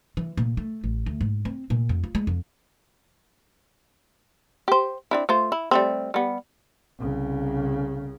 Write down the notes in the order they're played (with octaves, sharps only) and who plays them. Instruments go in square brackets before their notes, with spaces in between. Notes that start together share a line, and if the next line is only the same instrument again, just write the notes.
[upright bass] E3
A#2
A3
A1
D2
G#2
C4
A#2
F2
F4
G#3
F2
[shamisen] G4 C5
C4 D4 E4
A3 F4 C5
E4
G3 A3 C4
G3 B3
[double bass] C2 C#3